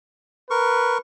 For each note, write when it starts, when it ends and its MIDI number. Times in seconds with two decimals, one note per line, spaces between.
0.51 0.98 70
0.51 0.98 71
0.51 0.98 85